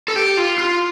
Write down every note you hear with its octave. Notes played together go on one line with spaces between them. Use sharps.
A4
G4
F4
F4